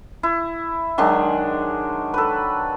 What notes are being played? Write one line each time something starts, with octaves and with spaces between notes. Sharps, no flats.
E4
D#3 F#3 G#3 D4
A4 B4